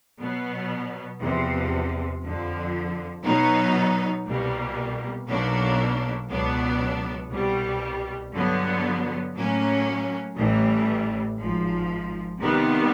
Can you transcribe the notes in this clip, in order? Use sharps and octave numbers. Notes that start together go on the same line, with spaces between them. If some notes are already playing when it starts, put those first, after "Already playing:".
B2 F#3 B3
E2 C3 F3
F2 D3 F3
B2 F#3 B3 D#4
C2 B2 G3 A#3
B1 B2 F#3 A#3 D4
C#2 B2 F#3 B3 D4
C2 B2 G3
G2 D3 F#3 B3
A2 F#3 A#3 C#4
A1 A2 E3 G3
G#1 G#2 F3
C3 D#3 G3 B3